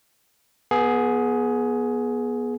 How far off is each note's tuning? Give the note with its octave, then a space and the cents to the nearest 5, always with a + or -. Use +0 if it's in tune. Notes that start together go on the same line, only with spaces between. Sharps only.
B3 -25 G#4 +15